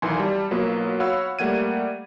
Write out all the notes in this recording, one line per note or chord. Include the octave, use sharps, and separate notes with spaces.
B1 E2 D#3 E3 G#5 C6
G3 A5
B1 F#3 A#3 B3 F4 B4
F#4 C#5 F5 F#5 B5 E6
G3 A3 A#3 F#5 G#6 D#7